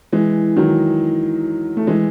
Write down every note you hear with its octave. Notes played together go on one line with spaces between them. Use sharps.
E3 G#3
D#3 F#3
A3
E3 G#3